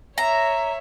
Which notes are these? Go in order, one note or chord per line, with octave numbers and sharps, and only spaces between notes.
C#5 E5 A#5